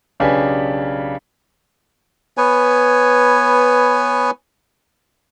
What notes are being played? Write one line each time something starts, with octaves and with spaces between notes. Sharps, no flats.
B1 C#3 D4 G4 B4 G#5
B3 B4 C#5 G#5